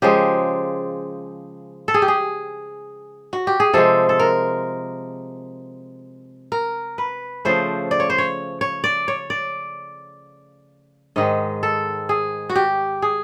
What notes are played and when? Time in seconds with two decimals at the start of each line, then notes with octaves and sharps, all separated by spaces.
0.02 C#3 F3 G#3 G4
1.88 A4
1.94 G#4
2.02 G4
2.08 G#4
3.33 F#4
3.47 G4
3.60 G#4
3.73 C3 F3 G#3 A4
4.09 A4
4.19 A#4
6.52 A#4
6.98 B4
7.45 C#3 F3 A3 C5
7.91 D5
8.00 C#5
8.10 C5
8.18 C#5
8.61 C#5
8.84 D5
9.08 C#5
9.30 D5
11.16 G#2 D#3 G#3 D#5
11.63 A4
12.09 G#4
12.49 F#4
12.56 G4
13.02 G#4